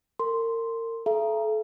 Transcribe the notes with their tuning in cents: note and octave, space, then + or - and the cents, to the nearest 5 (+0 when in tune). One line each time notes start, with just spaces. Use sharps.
A#4 -35 C6 +0
A4 -30 E5 +45 A#5 +10